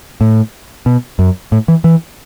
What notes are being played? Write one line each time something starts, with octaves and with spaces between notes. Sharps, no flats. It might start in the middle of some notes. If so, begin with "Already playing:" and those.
A2
B2
F#2
A2
E3
E3